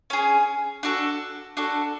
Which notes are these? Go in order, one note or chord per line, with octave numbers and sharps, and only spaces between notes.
C#4 G#4
D4 F#4 A4
D4 F#4 A4